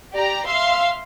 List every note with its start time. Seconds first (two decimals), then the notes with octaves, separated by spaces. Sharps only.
0.13 G4 D5 A#5
0.47 E5 F5 C6 E6